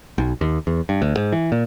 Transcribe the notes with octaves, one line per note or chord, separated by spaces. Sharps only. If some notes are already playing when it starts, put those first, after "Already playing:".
B1
D#2
E2
G2
D2
G#2
E3
A#2